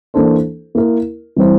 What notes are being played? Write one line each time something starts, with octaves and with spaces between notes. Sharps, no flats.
E3 A#3 D4 A4 C5
A#3 E4 A#4
E3 G3 C4 E4